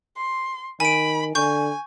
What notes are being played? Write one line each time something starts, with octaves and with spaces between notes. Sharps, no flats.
C6
D#3 G#5 B5 D7
D3 G#5 C#6 G6